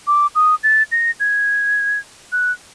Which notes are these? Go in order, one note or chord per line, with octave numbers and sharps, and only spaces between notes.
D6
D#6
A6
A#6
G#6
F#6